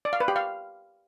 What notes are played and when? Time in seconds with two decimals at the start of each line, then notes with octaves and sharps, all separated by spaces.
0.05 D5
0.13 F5
0.20 B4
0.28 G4
0.36 F5